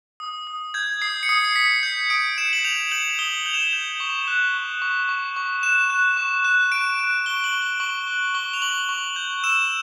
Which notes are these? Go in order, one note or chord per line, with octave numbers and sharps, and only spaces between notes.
D#6
D#6
G6 G#6
D#6 C7
C#7
D#6 C7
C7
D#6 B6
G6 C7
D#6 D7
G6 E7
F#7
G6 F7
G6 F#7
D#6 G7
G6 F7
E7
F7
G6
C#6
F#6
C#6
C#6
C#6
C#6
F#6 E7
F#6
C#6
F#6
F#6 D7
F#6
C#6 G7
F#7
C#6
G7
C#6 F#7
F#6
C#6 G7
F7
C#6 F#7
C#6
G6
E6 E7